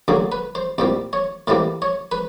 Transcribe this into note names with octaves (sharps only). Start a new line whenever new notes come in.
D2 D3 F#3 A#3 G#4
B4
C5
C2 A#2 G3 C5
C#5
A2 E3 G3 A#3 C5
C#5
B4